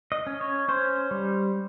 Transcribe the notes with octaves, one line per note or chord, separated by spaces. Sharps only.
D#5
C#4
C#5
C#4 C5
G3